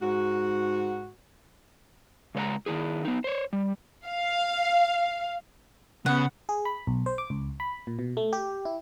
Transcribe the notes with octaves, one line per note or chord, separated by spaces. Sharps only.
G#2 F#4
C#3 G#3 C#5 F#5 A#5
D#3 F3 E4 G#4
B3 D#4
C5 C#5
G3
F5
C#3 B3 F#5
G#4
B5
B1
C5
D6
C#2
B5
A#2
B2
A3
G4
E4